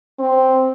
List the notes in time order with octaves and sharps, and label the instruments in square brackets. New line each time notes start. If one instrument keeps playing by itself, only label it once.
[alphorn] C4